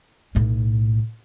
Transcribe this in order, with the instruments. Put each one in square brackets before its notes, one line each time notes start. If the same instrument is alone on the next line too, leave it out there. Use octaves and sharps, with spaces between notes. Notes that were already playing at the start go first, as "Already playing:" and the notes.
[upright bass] B1 A2